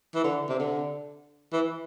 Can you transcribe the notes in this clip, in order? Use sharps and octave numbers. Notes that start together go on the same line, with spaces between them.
E3
D3
C3
D3
E3